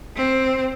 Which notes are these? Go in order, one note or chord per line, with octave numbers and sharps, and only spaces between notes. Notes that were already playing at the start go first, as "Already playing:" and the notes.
C4